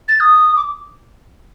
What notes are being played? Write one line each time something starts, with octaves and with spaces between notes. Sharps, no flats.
A6
D#6
D6